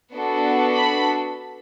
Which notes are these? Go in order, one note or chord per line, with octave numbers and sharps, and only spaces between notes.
B3 D4 F#4 A4
B5